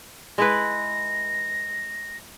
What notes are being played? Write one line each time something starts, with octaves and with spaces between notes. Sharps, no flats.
G#3 E4 B4 A#6